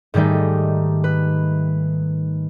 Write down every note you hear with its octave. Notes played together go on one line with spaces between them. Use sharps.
G#2 D#3 G3 A3 D#4
B4